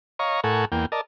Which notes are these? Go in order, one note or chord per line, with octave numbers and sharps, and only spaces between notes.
C#5 D#5 F5 A#5 C#6
A2 A4 A#4 F#5 G#5 C#6
E2 A#3 G5
A#4 D5 D#5 A5